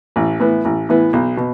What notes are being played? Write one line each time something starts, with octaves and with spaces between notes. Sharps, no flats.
A1
A2 E3 B3
A1
A2 E3 B3
B1
B2